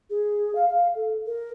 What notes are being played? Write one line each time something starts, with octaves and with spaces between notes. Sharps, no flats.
G#4
F5
F5
A4
A#4